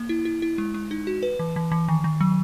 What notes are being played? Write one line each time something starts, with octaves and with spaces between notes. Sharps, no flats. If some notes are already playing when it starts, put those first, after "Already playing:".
Already playing: A#3
E4
E4
E4
G#3
G#3
D#4
F#4
B4
E3
E3
E3
D#3
D#3
F#3